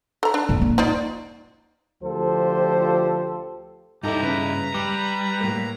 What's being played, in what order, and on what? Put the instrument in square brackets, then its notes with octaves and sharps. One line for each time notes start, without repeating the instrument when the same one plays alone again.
[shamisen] A4 A#5
D4
[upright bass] F2 A#2
A#3
[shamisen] D#4 F4 D5
[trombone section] D2 F3 F4 G4 A4 C5
[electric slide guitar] G2 E4 [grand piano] D#4 A4 [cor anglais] G4 [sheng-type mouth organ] A#5
[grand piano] C#3 [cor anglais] B4
[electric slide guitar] G3 [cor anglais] B4 [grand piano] D6
[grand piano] A2 A#3